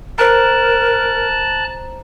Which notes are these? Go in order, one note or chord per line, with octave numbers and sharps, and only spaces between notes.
A#4 C5 A5 A#5 F#6